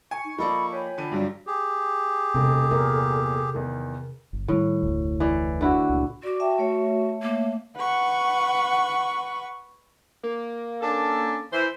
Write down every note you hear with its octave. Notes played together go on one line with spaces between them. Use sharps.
G#5 C#6
D#4
F3 A#3 D#4 A4 D5 B5
C#5 G5 G#5 B5
D3 F3 D#7
G2 F#3 G3 F#4
G4 G#4
E1 C3 C4 A4
E2 A#2 A#4
E2 D#3
G1
A2 D#3 G3
F1 D2
E3 D5
D3 E4 F#4
C#2 A#2
F#4 D5 D6
E5 G5 A5
A3 C#5 E5
A#3
B4 F#5 C#6
A#3
C#4 D4 A4
E3 C5